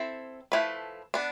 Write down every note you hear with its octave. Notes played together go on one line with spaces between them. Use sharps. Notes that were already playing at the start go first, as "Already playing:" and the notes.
Already playing: C4 E4 A4 C5
F3 A3 E4 B4
B3 D4